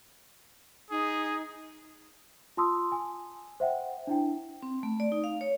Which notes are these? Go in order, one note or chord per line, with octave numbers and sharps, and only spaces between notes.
D#4 G#4
F4 A5 C6 D#6 E6
G#5
C5 E5 F#5 G5
D4 E4 G5
C4
A3
D5
D#4
F5
C#5